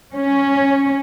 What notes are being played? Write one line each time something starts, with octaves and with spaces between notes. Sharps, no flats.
C#4